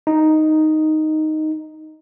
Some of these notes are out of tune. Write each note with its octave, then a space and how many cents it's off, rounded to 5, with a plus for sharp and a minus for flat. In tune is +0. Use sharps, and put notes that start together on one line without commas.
D#4 +0